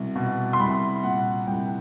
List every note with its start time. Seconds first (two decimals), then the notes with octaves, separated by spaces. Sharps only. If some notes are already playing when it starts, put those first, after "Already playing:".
Already playing: C2 B2
0.15 B2
0.53 C6
0.60 C2 B5
1.03 A#2 F#5
1.47 C2 G5